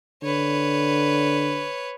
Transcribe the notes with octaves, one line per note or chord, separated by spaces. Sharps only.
D3 B4 C#5